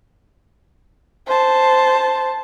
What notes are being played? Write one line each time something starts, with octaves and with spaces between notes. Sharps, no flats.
C5 A5